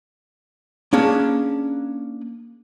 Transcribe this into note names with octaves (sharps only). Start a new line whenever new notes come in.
A#3 C#4 D4 G#4